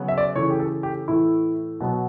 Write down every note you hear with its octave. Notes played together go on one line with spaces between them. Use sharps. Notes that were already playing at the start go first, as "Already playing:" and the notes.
Already playing: C#3 F#3 B3
E5
D5
C#3 E3 A3 C#5
G4
A4
G4
A2 E3 A3 E4
B2 F#3 B3